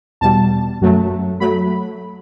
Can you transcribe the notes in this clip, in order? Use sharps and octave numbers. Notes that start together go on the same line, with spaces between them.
E2 B2 G3 A5
F#2 F#3 A3
F#3 A3 B5